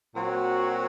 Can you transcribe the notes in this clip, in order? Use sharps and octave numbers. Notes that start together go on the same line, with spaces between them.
A#2 F#3 C4 F#4